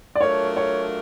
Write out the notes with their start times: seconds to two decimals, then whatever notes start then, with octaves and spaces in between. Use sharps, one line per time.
0.15 D5
0.20 F#3 A3 D4 F4 A#4 C#5
0.57 C#5